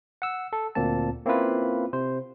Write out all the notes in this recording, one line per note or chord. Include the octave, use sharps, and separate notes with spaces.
F#5 E6
A4
D2 A#2 A#3 C4 A5
A#3 C4 C#4 E4 F4 B4
C3 C5